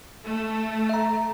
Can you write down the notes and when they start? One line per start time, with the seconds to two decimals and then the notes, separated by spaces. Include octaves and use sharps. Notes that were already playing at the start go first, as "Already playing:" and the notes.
0.23 A3
0.89 E5 A#5